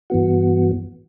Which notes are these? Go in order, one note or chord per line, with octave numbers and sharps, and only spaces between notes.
G2 E3 B3 F#4